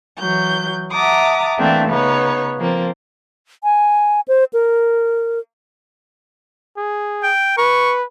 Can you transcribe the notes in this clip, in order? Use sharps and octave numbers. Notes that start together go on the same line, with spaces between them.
E3 F#3 G6
E5 F#5 A5 A#5 D6 D#6
E3 A3 A#3 C4 D4 E5
C#3 B3 D#4 C#5
F3 A#3 C4
G#5
C5
A#4
G#4
G5
B4 C#6